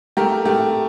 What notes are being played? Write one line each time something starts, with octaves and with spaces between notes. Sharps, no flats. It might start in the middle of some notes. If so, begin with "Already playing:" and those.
A3 G4 A#4
A3 G4